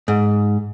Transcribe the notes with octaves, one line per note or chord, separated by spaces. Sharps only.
G#2